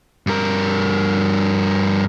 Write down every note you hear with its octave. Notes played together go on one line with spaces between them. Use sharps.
G2 A#4